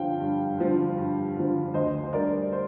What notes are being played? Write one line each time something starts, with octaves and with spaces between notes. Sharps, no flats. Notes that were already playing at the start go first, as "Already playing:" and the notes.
Already playing: G2 D3 F3 F5 G5
G2
D3 F3
G2
D3 F3
D2 C5 D#5
C5
D3 G3 A#4 D5
C5